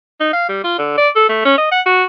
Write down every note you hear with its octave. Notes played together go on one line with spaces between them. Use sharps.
D#4
F5
G3
F4
D3
D5
A4
A3
C#4
D#5
F#5
F#4